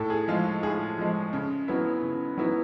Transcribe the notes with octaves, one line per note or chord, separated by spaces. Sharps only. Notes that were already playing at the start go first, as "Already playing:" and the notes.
Already playing: A2 A4
G#4
F3 G#3 F4
F4
A2 G#4
F3 G#3
C#3
F#3 B3 E4
C#3
F#3 B3 E4